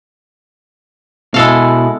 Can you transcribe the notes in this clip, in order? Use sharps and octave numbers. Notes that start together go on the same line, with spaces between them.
B2 G#3 E4 A4 F5